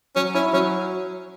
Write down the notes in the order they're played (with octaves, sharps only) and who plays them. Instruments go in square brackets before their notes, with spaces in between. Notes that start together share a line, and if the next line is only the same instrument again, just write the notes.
[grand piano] F#3 [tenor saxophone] C#4
[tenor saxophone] C#4 [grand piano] E4
[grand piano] F#3 [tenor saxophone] C#4